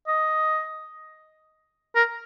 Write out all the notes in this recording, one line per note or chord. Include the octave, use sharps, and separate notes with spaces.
D#5
A#4